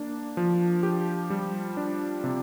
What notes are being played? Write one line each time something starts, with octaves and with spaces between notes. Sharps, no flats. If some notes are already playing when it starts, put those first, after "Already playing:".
Already playing: A#3 D4
F3
G4
G3
D4
C3